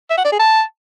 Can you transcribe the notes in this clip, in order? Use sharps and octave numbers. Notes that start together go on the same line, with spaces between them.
E5
F#5
D5
G#4
A5